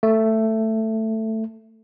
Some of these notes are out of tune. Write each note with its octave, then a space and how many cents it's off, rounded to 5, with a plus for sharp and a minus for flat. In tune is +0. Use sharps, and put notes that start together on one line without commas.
A3 +10